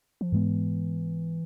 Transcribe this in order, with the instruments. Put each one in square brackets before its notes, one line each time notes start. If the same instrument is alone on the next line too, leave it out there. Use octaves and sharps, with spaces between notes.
[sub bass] F3
[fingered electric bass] G#2 G#3 B3 [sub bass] E3